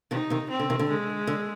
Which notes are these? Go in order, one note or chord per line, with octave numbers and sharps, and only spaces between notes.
C3 D#3 D#4
C3 D#3
C4
D3
C3 D#3
D3
G#3
D3